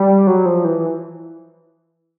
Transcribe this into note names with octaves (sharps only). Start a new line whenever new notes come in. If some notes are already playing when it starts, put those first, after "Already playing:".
Already playing: G3
F#3
F3
E3